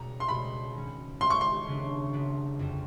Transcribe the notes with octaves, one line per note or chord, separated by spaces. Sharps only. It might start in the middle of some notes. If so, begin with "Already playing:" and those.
Already playing: C#2 B2 G3 A#5
C6
C#2 B2 G3 B5
D#3 G#3 C#4
D#3 G#3 C#4 C6
C#6
C6
C#3 F#3 B3 D4
C#3 F#3 B3 D4
F2 D3 G3 C4